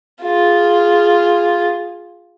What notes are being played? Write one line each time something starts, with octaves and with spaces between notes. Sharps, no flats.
F4 G#4